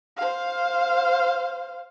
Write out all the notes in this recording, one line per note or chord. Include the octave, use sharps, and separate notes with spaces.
C5 F5